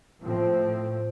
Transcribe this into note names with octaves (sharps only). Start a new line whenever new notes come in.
A2 F3 C4